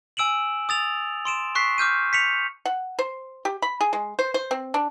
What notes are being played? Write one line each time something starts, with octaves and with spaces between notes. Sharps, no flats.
G#5 E6 D7 E7 F#7
D#6 A6 F7
C6 D7 E7
C#6 F#6 B6 C7
D6 F6 G6 D#7
B6 C#7 F7
F#5
C5
G4
B5
G#4
G#3
C5
C5
C4
D4